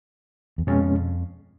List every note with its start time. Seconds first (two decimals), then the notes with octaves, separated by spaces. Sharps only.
0.58 E2
0.67 F2 B2 G#3 C#4